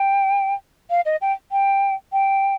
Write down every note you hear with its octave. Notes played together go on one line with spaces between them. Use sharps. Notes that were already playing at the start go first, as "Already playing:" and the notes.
Already playing: G5
F5
D#5
G5
G5
G5